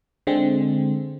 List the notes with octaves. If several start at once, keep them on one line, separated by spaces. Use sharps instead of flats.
D3 G#3 C4